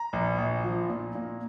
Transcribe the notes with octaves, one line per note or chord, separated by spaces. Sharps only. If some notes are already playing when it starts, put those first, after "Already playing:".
Already playing: A#5
A#1
A#1
F3
A#2
A#2